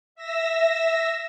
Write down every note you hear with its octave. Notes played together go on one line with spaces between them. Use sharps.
E5 E6 A#6